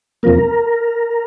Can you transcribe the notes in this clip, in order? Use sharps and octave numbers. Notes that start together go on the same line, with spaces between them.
E2 C3 F3 A#3 A#4